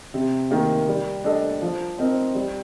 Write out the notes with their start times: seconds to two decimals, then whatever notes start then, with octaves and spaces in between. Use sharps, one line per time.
0.14 C3
0.51 D#3 A#3
0.88 G3
1.24 D4 A4 D#5
1.62 F3
1.99 C4 D#4 A#4
2.35 G3